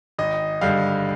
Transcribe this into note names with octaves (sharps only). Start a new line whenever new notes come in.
G#1 D#5
G2 D3 G3 F5